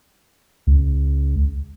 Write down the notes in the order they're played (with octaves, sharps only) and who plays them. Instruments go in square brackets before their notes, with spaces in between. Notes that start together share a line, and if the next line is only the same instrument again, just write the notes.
[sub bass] C#2